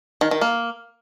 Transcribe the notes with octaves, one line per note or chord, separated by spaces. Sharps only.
D#3
D#3
A#3